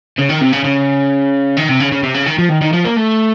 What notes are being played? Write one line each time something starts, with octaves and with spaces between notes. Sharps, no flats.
C#3
D#3
C3
C#3
C#3
D#3
C3
C#3
C#3
C3
C#3
D#3
F3
D#3
D#3
F3
A#3
A3